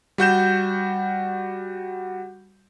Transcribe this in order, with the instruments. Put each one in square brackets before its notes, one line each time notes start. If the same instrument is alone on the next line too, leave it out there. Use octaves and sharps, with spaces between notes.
[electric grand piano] G3 F#4 G6 E7